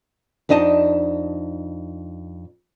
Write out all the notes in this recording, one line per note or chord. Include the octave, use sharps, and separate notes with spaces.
F2 D4 D#4 D#5 A5